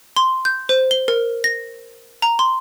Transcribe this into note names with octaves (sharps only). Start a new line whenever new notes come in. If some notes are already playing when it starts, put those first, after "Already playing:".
C6
G6
C5
G7
A#4
A#6
A#5
C6